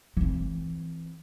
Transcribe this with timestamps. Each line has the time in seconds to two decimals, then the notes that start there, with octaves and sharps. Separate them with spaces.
0.17 E3 C4